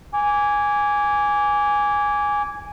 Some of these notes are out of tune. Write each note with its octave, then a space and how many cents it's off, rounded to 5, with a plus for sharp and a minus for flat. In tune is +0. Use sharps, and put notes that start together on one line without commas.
G#5 -5 D6 -20